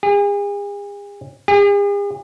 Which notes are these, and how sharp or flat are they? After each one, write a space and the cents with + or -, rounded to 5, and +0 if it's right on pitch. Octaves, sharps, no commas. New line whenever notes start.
G#4 -40
G#4 -45